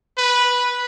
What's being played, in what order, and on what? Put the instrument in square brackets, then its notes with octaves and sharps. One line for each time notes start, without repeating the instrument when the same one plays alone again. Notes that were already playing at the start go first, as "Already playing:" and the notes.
[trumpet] B4